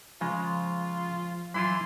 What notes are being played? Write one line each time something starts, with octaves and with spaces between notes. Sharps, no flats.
C#3 F3 G#3 F4
E3 F#3 E4 F4 C6